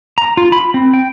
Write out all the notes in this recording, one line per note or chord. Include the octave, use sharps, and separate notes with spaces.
A#5
F4
B5
C4
G5